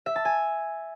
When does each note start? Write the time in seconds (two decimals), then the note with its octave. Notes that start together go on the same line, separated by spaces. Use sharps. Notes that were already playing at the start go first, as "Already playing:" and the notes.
0.06 E5
0.16 A5
0.25 G#5